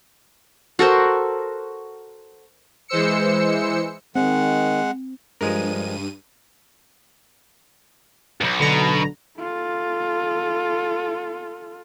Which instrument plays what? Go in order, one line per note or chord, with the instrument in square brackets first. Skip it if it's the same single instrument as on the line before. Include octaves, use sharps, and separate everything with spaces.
[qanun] F#4 A4 A#4 C5
[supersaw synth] E3 G#3 C5 E6 C#7
[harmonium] D#3 [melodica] G#3 F#5 [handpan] C4
[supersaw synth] G2 D#7 [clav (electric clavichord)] F3 G#3 A#4
[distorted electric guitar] B1 G2
[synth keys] B1 D3 A#5 [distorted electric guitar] B2
[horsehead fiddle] F4 A4